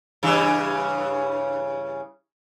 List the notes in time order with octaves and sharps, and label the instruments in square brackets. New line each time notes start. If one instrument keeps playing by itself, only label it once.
[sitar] G2 C#3 E3